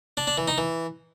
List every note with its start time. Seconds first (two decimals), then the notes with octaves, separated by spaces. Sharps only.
0.17 D4
0.27 D4
0.38 E3
0.48 D#4
0.58 E3